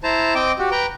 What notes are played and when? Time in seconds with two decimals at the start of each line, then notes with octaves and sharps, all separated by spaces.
0.03 E4 C5 A5 A#5
0.35 C4 D#5 G5 D6
0.59 F#4 G4
0.71 B4 G5 A#5